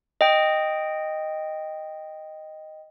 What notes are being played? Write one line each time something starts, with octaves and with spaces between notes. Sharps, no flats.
D#5 G5